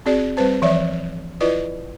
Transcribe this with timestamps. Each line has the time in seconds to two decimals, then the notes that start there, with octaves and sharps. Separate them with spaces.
0.06 C4 F#4 G#4 D5
0.37 G3 C4 B4 C5 A5
0.62 E3 F3 C#5 D5 E5
1.40 E4 F4 B4 D5 D#5